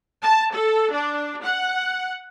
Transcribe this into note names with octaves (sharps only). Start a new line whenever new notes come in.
A5
A4
D4
F#5